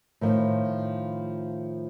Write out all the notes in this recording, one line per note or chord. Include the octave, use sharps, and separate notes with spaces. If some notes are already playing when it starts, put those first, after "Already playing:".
A2 D#3 F3